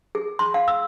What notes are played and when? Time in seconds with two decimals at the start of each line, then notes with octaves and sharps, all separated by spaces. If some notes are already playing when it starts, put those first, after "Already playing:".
0.15 G#4
0.39 C6
0.54 F5
0.68 E6